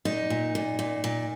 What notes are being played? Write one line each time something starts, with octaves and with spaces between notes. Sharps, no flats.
A#2 D#4
A#2
A#2
A#2
A#2